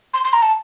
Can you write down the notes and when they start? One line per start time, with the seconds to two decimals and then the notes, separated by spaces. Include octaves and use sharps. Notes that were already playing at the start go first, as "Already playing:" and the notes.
0.14 C6
0.24 C6
0.33 A#5
0.42 A5